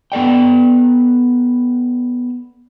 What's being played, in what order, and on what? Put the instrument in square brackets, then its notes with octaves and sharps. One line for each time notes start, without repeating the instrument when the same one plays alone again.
[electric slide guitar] B3 A4 D5 G5